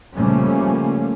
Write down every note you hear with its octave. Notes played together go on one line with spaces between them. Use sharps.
C#3 F3 G3 A3 A#3 C#4